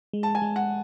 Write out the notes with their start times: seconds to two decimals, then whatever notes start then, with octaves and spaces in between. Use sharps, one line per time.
0.13 G#3
0.23 A5
0.35 G#5
0.42 G#3
0.56 F#5